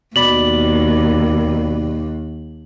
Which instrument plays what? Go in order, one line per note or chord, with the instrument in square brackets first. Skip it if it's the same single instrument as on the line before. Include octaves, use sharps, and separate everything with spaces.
[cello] D#2 [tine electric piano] B2 D5 B5 [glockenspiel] F#7